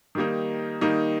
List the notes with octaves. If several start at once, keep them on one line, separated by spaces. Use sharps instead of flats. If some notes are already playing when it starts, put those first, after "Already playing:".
D#3 G3 A#3 D#4
D#3 G3 A#3 D#4